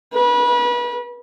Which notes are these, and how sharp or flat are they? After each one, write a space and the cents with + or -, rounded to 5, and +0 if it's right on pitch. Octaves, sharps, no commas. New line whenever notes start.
B4 -30